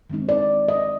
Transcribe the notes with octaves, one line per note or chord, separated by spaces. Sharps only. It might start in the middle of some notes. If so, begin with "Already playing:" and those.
D#3 G#3 C4 D#4
D5
D#5